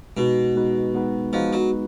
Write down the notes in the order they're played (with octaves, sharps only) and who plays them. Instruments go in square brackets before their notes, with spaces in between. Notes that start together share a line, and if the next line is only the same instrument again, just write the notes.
[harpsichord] B2 [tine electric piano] G#3 B3 D#4 F#4 B4
[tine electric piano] G#3 B3 D#4 F#4 B4
G#3 B3 D#4 F#4 B4
[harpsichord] F3 [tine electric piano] G#3 B3 D#4 F#4 B4
[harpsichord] F#3